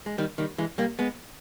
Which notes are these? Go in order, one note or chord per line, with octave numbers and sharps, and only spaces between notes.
G#3
D#3 G3
D#3 G3
E3 G#3
G3 A#3
G#3 B3